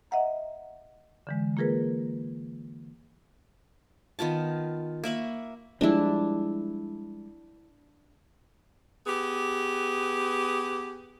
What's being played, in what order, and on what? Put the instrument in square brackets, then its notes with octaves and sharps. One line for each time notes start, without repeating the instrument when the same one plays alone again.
[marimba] D#5 E5 F#5 A#5
D3 E3 G#3
A#3 F4 G#4 A#4 B4
[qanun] D#3 B3 F4 A5
A#3 E5 B5 C#6
[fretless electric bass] F3 G3 G#3 [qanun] D4 E4
[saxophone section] B3 G4 G#4